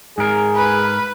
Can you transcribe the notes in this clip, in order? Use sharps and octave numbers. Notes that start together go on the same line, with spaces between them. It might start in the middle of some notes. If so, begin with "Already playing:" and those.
G#2 G#4 A#4
B4